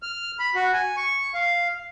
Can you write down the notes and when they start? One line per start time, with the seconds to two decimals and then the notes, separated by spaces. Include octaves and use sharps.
0.03 F6
0.39 B5
0.55 F#4
0.73 G#5
0.97 C#6
1.34 F5